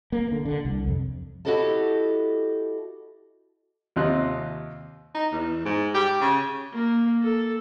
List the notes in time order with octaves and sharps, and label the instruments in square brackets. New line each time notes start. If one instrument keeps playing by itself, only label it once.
[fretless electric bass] A#3
D3
D3
C2
F2
[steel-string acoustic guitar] E4 F#4 G4 A4 D#5 A5
[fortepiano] D#2 C3 C4 F4 D#5 F#6
[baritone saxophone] D#4
E2
G#2
G4
C#3
[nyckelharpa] A#3
A4